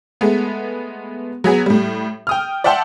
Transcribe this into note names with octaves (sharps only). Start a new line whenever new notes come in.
G#3 A3 B3
F#3 B3 G#4
A2 G3
G5 D#6 F6
D5 E5 F#5 G5 A5 C6